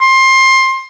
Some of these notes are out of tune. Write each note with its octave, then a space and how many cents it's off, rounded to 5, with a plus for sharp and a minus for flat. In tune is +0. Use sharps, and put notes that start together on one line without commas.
C6 +20